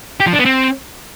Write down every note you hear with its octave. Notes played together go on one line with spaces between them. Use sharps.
G4
F3
D4
B3
C4